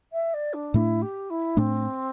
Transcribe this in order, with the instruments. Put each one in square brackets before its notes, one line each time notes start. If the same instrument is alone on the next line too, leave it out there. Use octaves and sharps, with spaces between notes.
[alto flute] E5
D5
D4
[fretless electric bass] A2 A3 D4 [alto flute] E4
[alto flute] G4
E4
[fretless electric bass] A2 A3 D4 [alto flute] C4